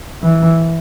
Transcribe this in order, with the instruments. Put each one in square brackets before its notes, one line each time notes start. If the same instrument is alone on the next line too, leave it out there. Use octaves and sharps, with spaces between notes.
[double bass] E3